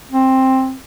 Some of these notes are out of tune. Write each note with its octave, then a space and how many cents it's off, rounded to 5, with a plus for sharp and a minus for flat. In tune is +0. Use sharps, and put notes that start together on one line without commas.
C4 +10